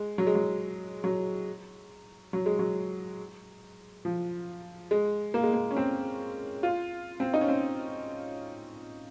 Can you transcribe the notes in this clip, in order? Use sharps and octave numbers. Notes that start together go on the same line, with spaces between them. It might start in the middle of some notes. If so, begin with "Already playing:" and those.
Already playing: G#3
F#3
G#3
F#3
F#3
F#3
G#3
F#3
F3
G#3
A#3
G#3
A#3
C#4
C4
F4
C4
D#4
C#4
C4